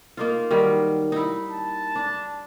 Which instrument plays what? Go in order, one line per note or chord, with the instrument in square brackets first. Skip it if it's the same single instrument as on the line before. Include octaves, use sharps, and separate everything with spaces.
[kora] A#3 D#4 F4
D#3 F#3 G3
D#4 E4
[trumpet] A5
[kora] D4